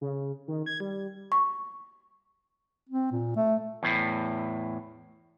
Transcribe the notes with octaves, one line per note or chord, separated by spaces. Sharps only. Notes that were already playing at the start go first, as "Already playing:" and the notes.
C#3
D#3
G#6
G3
C#6
C4
A#2
A3
E2 A2